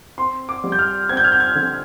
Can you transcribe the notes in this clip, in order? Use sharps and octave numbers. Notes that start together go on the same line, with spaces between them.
C4 C6
D6
G3
G6
F6
C4 G#6
G6
F6
G6
G#6
D3